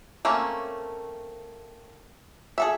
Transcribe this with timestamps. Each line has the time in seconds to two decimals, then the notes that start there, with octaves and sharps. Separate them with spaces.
0.25 A3 A#3 C4 C#4
2.58 G#4 A4 E5